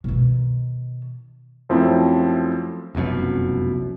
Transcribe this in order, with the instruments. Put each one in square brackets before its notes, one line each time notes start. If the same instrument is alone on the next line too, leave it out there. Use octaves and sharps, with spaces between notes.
[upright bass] B2 D#3
[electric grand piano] F#2 F3 A3 C4 E4
[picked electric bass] F1 C2 F#2 B2